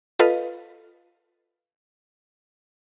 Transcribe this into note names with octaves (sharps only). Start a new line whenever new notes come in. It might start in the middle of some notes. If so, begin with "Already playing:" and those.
F4 A4 B4 D#5 F5